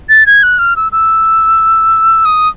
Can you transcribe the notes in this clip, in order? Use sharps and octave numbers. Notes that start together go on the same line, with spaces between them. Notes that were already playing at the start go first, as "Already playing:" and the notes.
A6
G#6
F#6
F6
E6
E6
D#6